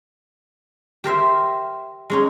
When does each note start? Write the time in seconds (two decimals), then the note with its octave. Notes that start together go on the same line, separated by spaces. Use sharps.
1.04 G4 A#4 C5 E5
2.10 G#3 C#4 D#4